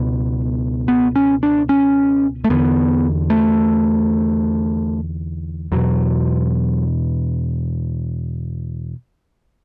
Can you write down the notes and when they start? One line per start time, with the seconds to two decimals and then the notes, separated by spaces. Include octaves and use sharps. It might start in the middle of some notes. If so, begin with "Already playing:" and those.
Already playing: C#2 B2 B3
0.88 B3
1.16 C#4
1.43 D4
1.69 C#4
2.44 A3
2.50 E2 D3 B3
3.30 A3
5.72 E2 B2 F#3